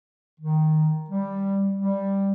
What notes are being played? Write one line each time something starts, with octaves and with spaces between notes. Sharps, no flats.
D#3
G3
G3